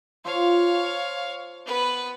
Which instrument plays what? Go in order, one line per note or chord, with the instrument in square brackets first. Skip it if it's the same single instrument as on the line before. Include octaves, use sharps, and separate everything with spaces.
[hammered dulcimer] F4 A4 C5 [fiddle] C#5 F5
[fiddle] B3 B4